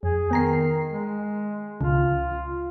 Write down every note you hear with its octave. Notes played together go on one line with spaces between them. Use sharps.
F2 G#4
D#3 B3 A#5 C7
G#3
C#2 C#3 F4